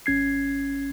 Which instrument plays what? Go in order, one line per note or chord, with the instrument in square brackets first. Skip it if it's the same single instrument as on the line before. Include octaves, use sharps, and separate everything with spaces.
[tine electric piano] G#1 C#4 G#6 C7